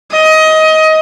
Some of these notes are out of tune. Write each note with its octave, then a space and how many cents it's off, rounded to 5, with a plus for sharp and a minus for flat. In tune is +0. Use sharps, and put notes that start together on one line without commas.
D#5 +20